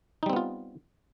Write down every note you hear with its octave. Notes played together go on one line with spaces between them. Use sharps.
G3 B3 C4 D#4 F4